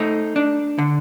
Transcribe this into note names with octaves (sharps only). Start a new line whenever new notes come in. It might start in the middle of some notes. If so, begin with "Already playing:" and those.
Already playing: A3 D#4
D4
D3